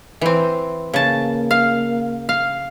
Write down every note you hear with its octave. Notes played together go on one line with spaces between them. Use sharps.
E3 C4
C#3 A#3 A5
F5
F5